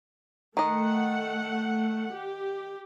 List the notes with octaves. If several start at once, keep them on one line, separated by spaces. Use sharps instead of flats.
D#3 A3 D#5 F#5
G4